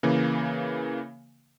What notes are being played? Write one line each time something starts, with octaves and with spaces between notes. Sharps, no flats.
C#3 E3 A#3